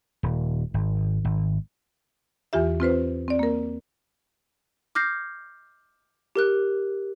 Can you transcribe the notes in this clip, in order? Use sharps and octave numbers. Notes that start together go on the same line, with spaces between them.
D#1
G#1
G#1
E2 E3 F4 G4 E5
C4 F4 B4 C5
C4 D5
A#3 A#4
D6 F6 G6 A#6 C7
G4 A#4 F#6